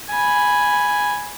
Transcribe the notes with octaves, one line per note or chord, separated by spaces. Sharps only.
G#5 B5